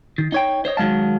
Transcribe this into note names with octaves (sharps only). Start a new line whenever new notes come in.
D#3
D#4 C#5 G5
C5 C#5 D#5
D#3 F#3 G#3 F5 A5